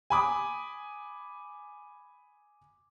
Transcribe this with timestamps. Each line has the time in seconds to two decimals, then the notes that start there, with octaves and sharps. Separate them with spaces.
0.10 G#5 B5 D6 D#6